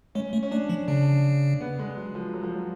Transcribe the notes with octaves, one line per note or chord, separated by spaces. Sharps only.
G#3 C#4
A3
C#4
A3 D4
F3
C#3 D4
B3
G#3
F#3
F3
F#3
F3
F#3